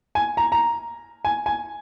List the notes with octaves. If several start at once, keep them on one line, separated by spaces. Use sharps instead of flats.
G#5
A#5
A#5
G#5
G#5